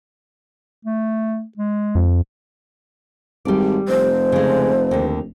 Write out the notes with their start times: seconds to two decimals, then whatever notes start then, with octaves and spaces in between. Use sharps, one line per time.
0.85 A3
1.57 G#3
1.95 F2
3.45 G#1 G3 D5
3.89 F1 C5
4.32 C#3 G#3
4.91 D#2 D3